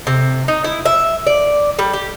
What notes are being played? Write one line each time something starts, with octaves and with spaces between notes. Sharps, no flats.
C3
D#4
E4
E5
D5
G3
G4